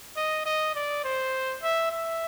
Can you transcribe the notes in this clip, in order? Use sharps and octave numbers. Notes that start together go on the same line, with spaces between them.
D#5
D#5
D5
C5
E5
E5